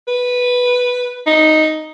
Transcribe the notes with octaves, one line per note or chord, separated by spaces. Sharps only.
B4
D#4